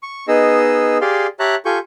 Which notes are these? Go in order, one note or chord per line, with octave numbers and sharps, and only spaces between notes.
C#6
B3 D#4 G#4 D#5 E6
G4 G#4 D5 F5 C6
G4 C#5 E5 A5 A#5 F#6
F4 G4 A4 G#5 C#6 G6